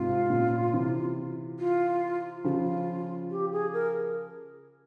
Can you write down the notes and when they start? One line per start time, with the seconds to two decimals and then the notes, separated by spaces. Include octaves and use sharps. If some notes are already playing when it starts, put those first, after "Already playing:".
Already playing: G#2 C3 F4
0.30 A#2 C#3
0.73 C3 E3
1.59 F4
2.44 C#3 F3 G4
2.48 F4
3.31 G4
3.52 G#4
3.73 A#4